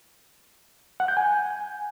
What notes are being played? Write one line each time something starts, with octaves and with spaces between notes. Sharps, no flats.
F#5
G6
G#5